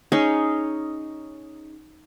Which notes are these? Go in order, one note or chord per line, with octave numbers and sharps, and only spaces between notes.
C#4 D#4 G#4 C#5